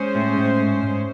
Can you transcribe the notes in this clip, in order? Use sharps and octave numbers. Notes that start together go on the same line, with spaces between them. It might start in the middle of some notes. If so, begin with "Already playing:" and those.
Already playing: G#3 C#4 G#4 C5
A2
A2
G#2
G#2